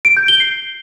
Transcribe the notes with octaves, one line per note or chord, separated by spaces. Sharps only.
D7
G6
G7
C7